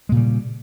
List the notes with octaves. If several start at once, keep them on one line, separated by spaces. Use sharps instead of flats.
A#2 C#3 G3 G#3